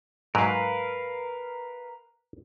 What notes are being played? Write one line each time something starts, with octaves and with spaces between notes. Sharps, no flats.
G#2 F#3 A#4 B4 F5